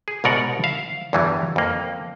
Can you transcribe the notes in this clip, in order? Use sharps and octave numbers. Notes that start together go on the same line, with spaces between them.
G#4
C2 G#2 B2 A#4 D5 F#5
E5 F5
E2 G2 E3 F#3 G3
F2 A#3